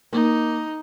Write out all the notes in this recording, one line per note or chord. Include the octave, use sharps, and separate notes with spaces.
A#3 D#4